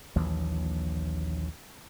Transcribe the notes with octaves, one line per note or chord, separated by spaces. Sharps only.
A#1 D#2 E3 F#3